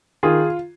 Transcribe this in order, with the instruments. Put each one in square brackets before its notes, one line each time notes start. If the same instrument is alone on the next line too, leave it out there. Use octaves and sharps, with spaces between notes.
[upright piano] D#3 F4 G#4